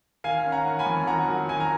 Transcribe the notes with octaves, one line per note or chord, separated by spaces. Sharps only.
D#3 F5 G#5
C#4
F#5 A#5
D#3
G#5 B5
F2
D#3 F#5 A#5
F#3
D#3 G#5
A#5